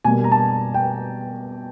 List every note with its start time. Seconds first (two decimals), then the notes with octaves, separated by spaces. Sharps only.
0.05 B2 G3 A#3 G#5
0.24 A#5
0.32 A5
0.74 G5